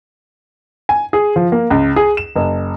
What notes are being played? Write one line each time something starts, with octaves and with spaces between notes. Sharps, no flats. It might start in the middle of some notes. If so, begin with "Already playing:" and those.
G#5
G#4
F3
A#3
C#2
G#4
E7
F#1